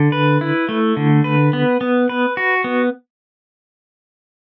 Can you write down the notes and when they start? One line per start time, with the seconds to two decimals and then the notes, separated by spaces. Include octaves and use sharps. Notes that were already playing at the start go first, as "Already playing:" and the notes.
Already playing: D3
0.12 B4
0.41 E4
0.69 A3
0.97 D3
1.24 B4
1.53 B3
1.81 B3
2.09 B4
2.37 F#4
2.64 B3